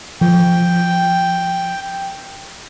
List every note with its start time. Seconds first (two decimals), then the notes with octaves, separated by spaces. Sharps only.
0.21 F3 G5